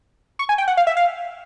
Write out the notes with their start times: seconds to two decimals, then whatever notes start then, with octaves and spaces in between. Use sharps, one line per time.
0.39 C#6
0.49 G#5
0.58 G5
0.68 F#5
0.77 F5
0.87 E5
0.97 F5